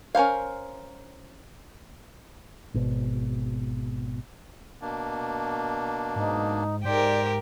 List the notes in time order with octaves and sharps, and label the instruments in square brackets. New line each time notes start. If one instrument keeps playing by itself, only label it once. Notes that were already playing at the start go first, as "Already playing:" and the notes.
[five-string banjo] C#4 A#4 C5 F5
[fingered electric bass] G#1 B2
[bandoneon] B2 A#3 D4
[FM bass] G#2 [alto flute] D#4
[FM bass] G#2 [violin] G4 A#4 [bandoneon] C5 [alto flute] D5